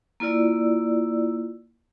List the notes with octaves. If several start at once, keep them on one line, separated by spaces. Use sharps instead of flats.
A#3 E4 F4 D5 E6